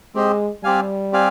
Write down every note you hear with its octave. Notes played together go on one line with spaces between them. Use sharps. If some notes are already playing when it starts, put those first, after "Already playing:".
G#3 C4 G4 C5 D#5
G3 C4 G4 D5 F5 G#5
C4 G4 D5 F5 G#5